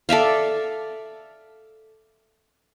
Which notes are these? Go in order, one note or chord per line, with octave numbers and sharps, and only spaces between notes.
A4 D5 E5 F5